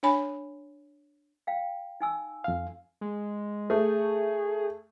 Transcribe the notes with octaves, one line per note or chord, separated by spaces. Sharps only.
D4 C#5 G#5 B5
F5 G5
D#4 G#5 E6
F2 F5
G#3
A3 G#4